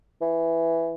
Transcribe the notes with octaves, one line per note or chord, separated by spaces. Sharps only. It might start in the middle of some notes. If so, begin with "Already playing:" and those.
E3